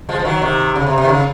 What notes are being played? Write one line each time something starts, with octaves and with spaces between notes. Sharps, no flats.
F3 G#3
F3
D#3 F#3
C3 D#3
C#3
C3
C3
D#3
C#3